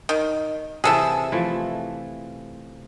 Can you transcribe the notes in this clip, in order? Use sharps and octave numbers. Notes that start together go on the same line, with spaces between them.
D#3
C3 E3 G#4 A4 E5
E3 F3 A3